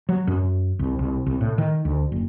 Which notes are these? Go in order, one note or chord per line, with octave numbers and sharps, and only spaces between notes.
F#3
F#2
C2
C2
C2
A2
D#3
D2
F#1